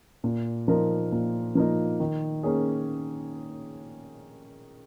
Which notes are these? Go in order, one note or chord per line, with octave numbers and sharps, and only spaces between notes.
A#2
F3 A#3 D#4 A#4
A#2
F3 A#3 D#4 A#4
D#3
A#3 C#4 G#4